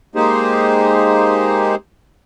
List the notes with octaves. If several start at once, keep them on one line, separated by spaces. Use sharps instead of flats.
G#3 A#3 D#4 G4 G#4 C5